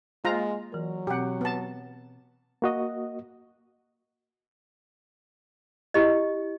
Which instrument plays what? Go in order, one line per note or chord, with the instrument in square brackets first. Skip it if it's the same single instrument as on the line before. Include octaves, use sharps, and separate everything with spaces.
[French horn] G#3 [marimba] A#3 C5 [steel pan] F4 A#5
[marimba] E3 A#4 [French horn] F#3
[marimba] B2 C4 [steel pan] G4 F#5
[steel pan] B3 A5
[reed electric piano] A#3 F#4 D#5
[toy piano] E4 G4 D#5